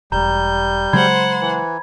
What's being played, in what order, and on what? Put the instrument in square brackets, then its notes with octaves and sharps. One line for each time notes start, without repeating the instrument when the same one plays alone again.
[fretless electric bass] E1 [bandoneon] G3 G6 [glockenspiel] A#5
[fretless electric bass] C#3 F#3 G#3 [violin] C5 F#5 [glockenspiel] B5 G#6
[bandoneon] E3